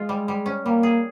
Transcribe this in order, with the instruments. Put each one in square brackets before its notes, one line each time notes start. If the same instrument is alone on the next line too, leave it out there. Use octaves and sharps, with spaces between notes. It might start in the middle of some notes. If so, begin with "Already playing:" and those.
Already playing: [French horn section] G#3 [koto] F4
[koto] G3
G3
C#4
[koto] G3 [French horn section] A#3
[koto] G#4